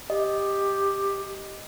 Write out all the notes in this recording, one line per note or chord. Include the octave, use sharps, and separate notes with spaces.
G4 D#5